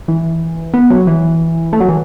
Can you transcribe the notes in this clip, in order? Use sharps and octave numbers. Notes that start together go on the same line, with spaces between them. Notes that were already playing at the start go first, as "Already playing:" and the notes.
E3
B3
F#3
E3
A3
F#3
E3